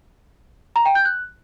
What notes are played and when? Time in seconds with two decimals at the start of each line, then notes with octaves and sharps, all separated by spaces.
0.76 A#5
0.85 G5
0.95 G6
1.05 F#6